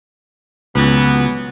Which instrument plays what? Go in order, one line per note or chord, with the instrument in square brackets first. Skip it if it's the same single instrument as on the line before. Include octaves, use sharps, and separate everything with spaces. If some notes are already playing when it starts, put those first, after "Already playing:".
[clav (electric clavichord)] C#2 [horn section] E3 F#3 B3